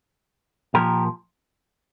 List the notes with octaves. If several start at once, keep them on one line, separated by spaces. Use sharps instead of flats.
A#2 F3 G4 A#4